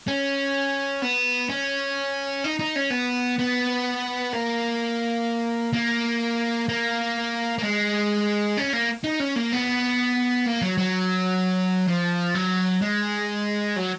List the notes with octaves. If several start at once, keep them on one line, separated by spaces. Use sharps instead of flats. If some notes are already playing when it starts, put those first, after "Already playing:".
C#4
B3
C#4
D#4
D#4
C#4
B3
B3
A#3
A#3
A#3
A#3
G#3
C#4
A#3
D#4
C#4
A#3
B3
A#3
F#3
F#3
F3
F#3
G#3
F#3